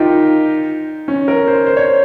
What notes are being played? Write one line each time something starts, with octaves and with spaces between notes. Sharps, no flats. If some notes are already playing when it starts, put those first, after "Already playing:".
Already playing: D#4 F4 G4 A#4
C#4
A#4
C5
C5
C#5
C5